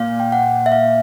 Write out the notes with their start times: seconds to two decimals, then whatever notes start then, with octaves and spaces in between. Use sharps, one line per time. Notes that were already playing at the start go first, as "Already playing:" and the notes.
Already playing: A#2 F5
0.20 G5
0.32 F#5
0.66 E5
0.72 F5